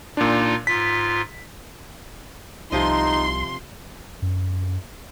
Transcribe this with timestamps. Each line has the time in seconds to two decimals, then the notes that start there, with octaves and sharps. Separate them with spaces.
0.17 A#2 D4 D#4 F4
0.67 G#2 F4 B6
2.72 C2 C3 F3 D#4 D#5 C6
4.22 F#2